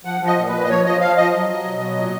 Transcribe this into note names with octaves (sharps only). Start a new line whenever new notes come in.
F3 F#5
F3
D#5
A#2
A#2 B4
D#5
F3 C#5
F3 D#5
F3 F5
F3 D#5
F#3
F#3
B2
F#3
A#2